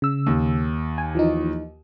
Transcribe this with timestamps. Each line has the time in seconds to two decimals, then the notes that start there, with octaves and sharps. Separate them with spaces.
0.02 C#3 E6
0.26 D#2
0.98 G#5
1.15 E3 F3 D#4